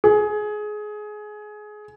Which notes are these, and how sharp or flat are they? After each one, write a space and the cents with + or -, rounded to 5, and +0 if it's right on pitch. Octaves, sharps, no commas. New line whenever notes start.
G#4 +20